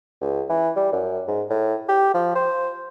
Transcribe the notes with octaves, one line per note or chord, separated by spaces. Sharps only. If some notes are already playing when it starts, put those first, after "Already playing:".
C#2
E3
G3
F#2
G#2
A2
G4
F3
C5